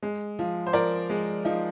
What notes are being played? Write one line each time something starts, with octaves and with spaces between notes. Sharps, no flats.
G#3
F3
C5
F3 A#4 D5
G#3
F3 D#4